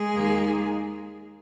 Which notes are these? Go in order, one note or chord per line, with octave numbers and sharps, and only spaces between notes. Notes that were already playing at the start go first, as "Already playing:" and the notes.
Already playing: G#3 G#4
D#2 D#3 A#3